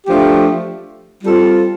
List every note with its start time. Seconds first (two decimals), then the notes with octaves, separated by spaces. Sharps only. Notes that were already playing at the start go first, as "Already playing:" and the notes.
0.07 F3 A3 D4 G4
1.22 G3 C4 F4 A4